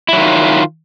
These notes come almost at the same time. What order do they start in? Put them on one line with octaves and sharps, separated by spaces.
E4 F#3 D#3 F4